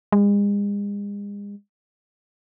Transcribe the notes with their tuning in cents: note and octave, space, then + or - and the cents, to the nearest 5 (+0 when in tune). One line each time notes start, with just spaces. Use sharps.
G#3 -40